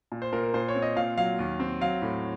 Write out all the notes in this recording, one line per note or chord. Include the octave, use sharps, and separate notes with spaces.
A#2
C5
A#2 A#4
A#4
A#2 C5
C#5
C4
D#5
A#2 F5
F#3 F5
D#2
C4
F#3 F5
A2